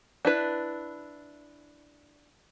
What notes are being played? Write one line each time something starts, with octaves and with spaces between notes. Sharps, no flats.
D4 E4 B4